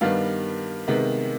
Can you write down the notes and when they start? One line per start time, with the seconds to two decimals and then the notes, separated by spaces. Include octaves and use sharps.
0.01 G2 D#3 G3 B3 F5
0.87 C3 D#3 G#3 B3